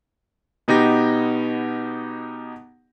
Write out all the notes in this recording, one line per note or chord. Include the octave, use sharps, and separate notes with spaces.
B2 B3 D#4 G4 A#6